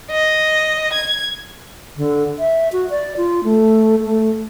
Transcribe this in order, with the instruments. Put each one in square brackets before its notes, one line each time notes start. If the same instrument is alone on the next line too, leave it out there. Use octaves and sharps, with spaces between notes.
[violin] D#5
G#6
[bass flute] D3
E5
F#4
D5
F4
A3
A3